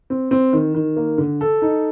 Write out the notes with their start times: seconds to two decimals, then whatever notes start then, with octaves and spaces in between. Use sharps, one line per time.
0.10 C4
0.31 C4
0.53 D#3
0.75 D#3
0.96 A#3
1.18 D3
1.41 A4
1.62 D#4